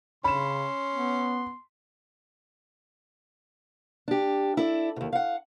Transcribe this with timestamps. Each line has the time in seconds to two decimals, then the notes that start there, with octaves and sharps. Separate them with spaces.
0.24 C#3 C#4 B5 C6 E7
0.94 B3
4.08 D4 G4
4.57 E4 A4 D5
4.96 D#2 B2
5.12 F5 F#5